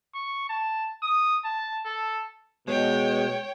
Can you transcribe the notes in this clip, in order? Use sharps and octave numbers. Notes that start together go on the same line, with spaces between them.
C#6
A5
D#6
A5
A4
B2 G#3 C#5 G5